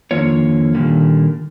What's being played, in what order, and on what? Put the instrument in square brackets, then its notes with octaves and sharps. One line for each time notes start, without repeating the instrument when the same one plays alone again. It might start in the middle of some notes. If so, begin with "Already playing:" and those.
[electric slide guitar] F2 D3 D#3 A#3 F4 C#5
A#2 D3 D#3 G3 A#3